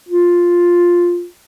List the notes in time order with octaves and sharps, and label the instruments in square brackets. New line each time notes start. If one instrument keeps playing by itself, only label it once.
[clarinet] F4